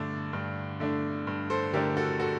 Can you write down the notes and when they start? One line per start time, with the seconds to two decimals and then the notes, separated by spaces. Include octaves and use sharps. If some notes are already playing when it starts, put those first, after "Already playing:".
Already playing: G2 D3 A3 D4
0.33 G2
0.80 D3 A3 D4
1.27 G2
1.50 A4 C5
1.73 D3 A3 D4 G4 A#4
1.97 F#4 A4
2.20 F#4 A4